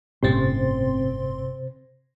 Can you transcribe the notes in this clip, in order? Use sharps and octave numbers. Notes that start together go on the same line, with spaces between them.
G1 A2 C3 C4 C#4 C5 C6 A6